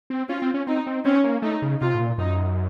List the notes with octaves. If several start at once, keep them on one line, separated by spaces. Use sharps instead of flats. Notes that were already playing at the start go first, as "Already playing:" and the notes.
C4
C#4 F4
C4
C#4
C4 D#4
C4
C4 C#4
A#3
A3 D#4
C#3
C3 F4
A2
A#2
F#2 D#4